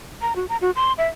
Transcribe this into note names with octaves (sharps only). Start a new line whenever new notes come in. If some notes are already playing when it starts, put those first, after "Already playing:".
A#5
F#4
A#5
F#4
C6
E5